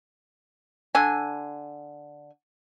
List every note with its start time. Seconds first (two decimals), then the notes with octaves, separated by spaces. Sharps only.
0.95 D3 G#5